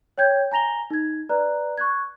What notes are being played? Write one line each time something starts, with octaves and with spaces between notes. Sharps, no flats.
C#5 G5 G6 G#6
G#5 A#5 A#6 F7 G7
D#4 G#6
B4 D5 A#5 F#6
C#6 F#6 G#6